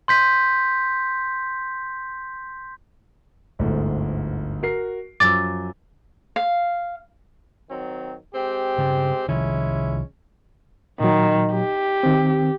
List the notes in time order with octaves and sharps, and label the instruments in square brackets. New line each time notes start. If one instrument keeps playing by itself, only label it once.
[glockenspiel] C6 G6 B6
[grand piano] G1 D2 G#2
F#4 A#4 C7
[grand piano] F#2 F3 E6 [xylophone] D6 A6
[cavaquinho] F5
[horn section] D#3 F#3 C4
G#3 C4 G4
[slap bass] G2 C#3
[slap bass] C2 D#3 F3 [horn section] G#3 C#4 E4
[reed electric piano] A#2 F#3 [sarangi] D#3
[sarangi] G4
[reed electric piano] D#3 C4